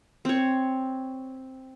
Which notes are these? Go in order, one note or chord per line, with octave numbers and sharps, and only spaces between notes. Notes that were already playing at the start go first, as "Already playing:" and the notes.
C4 C#5